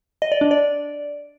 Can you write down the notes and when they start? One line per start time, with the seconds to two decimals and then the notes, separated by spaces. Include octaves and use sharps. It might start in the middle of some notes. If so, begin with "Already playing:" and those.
0.22 D#5
0.32 D5
0.41 D4
0.51 D5